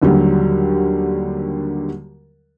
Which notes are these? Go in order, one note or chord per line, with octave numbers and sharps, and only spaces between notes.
D#2 D3 F#3 G3